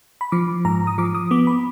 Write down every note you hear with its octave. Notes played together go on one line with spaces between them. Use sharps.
B5
F3 D6
G#2 A#5
D#6
F3 D6
D#6
B3 D6
B5